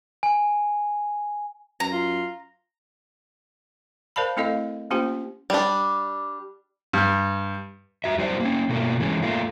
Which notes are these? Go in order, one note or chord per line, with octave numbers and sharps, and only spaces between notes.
G#5
F#2 A#5
F4
A#4 C5 D5 F5 A5 B5
A3 C4 E4 A4 D#5 F5
A#3 C#4 F4 G4 C5 G5
G3 D4
G2
F#4 E5
F#3 G3 E4 G4 C5 D5
A#3 C#4
B2 A3 A#3
E3 G#3 C#4
A3 A#3 F4